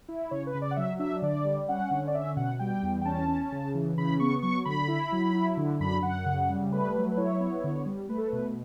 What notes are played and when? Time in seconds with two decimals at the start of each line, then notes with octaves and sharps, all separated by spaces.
0.08 E4
0.31 C#3 C#5
0.47 B4
0.54 C#3
0.62 D5
0.71 F#5
0.76 F#3 E5
0.99 D4 E5
1.22 D3 D5
1.45 G3
1.69 C#4 F#5
1.91 D3
2.08 D5
2.14 C#4 E5
2.36 B2 F#5
2.59 G3 G5
2.83 E2
3.02 G5
3.05 C#4 A5
3.28 C#4
3.52 C#3
3.74 E3
3.98 C#3 B5
4.20 B3 C#6
4.43 F#3 C#6
4.65 D3 B5
4.88 E4
5.12 F#3
5.35 E4
5.57 D3
5.80 F#2 B5
6.03 F#2 F#5
6.26 C#3
6.50 G3
6.72 A3 B4
6.95 F#3
7.11 B4
7.17 E4 C#5
7.40 B3
7.64 D3
7.86 G3
8.09 A3 B4
8.18 A4
8.27 B4
8.33 B2